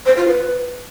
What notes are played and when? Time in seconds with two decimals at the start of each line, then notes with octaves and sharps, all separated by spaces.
0.06 C5
0.17 F4
0.28 B4